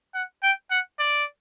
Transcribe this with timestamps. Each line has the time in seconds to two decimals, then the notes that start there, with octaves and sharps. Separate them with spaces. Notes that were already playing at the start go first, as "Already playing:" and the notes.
0.14 F#5
0.43 G5
0.70 F#5
0.99 D5